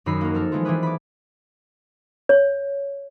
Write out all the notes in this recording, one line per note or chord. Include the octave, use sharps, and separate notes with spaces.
F#2 D#3 D#4 B5 E6 C7
A#3 F#4 A#4
F3 A4 A#4
E3 F3 G#3 A3 B3 F4
E3 C4 D4 F4 G#4 B4
B5 D6
C#5